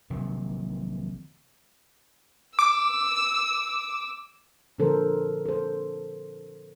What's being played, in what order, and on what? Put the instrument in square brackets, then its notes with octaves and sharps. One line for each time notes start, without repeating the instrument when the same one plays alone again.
[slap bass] A#1 C3 D#3 F#3
[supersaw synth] D6 [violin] E6
[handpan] A#2 D3 F3 A4 A#4 C5
A4 C5